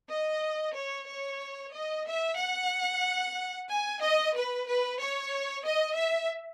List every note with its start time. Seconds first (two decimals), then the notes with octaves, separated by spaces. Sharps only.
0.11 D#5
0.76 C#5
1.09 C#5
1.73 D#5
2.06 E5
2.38 F#5
3.69 G#5
4.01 D#5
4.35 B4
4.67 B4
4.99 C#5
5.65 D#5
5.97 E5